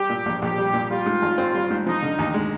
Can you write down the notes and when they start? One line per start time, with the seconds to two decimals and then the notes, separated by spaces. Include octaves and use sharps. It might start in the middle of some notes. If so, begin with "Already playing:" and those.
Already playing: G3 G4
0.10 A#2
0.26 A#1
0.42 A#1 G4
0.58 G3
0.73 A#2
0.90 G3 F4
1.06 G#2
1.22 G#1
1.38 C4
1.55 G3
1.70 G#2
1.86 F3 D#4
2.02 D3
2.19 D#2
2.34 G#3